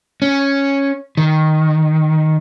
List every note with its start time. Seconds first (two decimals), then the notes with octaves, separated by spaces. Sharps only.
0.22 C#4
1.17 D#3